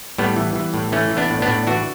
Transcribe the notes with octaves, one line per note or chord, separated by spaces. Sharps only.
A2 G3 B3
E3
E3
A2
E3 A3 C#4
E3
B3 D4
A2
B3 D4
A2
E3 D4 F#4